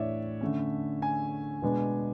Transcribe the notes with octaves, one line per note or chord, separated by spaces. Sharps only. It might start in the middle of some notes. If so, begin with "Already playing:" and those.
Already playing: A2 E3 D4 C#5 D5 E5
D3 A3 C#4
G#5
B2 G#3 B3 D4